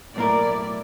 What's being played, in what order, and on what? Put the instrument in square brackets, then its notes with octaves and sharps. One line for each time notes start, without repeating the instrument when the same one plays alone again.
[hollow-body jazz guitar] B1 A#3 A#4 [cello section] A2 E4 D5